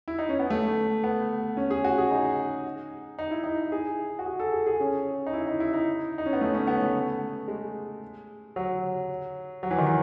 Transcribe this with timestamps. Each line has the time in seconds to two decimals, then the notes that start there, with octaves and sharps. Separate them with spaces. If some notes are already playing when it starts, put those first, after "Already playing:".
0.08 E4
0.19 D#4
0.29 C#4
0.39 B3
0.50 A3
1.04 B3
1.57 C#4
1.71 G#4
1.85 F#4
1.98 G#4
2.11 D#4
3.19 D#4
3.31 E4
3.44 D#4
3.72 G#4
4.19 F#4
4.26 G#4
4.40 A4
4.53 G#4
4.66 G#4
4.80 C#4
5.26 D#4
5.33 E4
5.47 D#4
5.60 E4
5.73 D#4
6.18 D#4
6.26 C#4
6.33 B3
6.41 A3
6.54 C#4
6.67 B3
6.81 A3
7.48 G#3
8.56 F#3
9.63 F#3
9.71 E3
9.79 D#3
9.87 E3